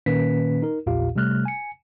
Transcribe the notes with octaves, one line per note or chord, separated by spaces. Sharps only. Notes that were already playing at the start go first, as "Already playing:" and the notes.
A#2 D#3 A#3 C#4 B4 B6
D#4 A#4
A#1 E2 A#2 F4 G4 F5
C3 G3 A3 F6 F#6
G#5 C#7